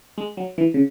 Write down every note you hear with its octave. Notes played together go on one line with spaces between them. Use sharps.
G#3
F#3
E3
C#3